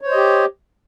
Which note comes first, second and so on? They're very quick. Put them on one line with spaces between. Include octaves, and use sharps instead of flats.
C#5 C5 D#5 G4